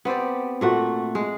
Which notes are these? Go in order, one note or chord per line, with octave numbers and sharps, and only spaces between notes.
B3 C4 G4 D5
A#2 A3 F#4
G#3